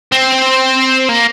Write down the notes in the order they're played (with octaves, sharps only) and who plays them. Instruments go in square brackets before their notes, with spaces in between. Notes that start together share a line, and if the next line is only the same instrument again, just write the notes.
[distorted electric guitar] C4
A#3